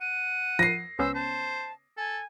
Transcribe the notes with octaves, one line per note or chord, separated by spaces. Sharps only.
F#5 D#7
F3 A#6 C7
C#2 B3 C#4 C5 E6
C5 A5
A4 G#5